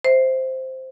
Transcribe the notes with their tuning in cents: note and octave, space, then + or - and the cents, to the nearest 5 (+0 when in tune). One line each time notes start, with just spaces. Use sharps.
C5 +0 E5 -15